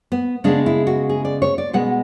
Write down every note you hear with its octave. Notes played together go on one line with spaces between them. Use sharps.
B3
C#3 G#3 B3 D4
E4
F#4
G#4
D5
C#5
D5
B2 G#3 B3 F#5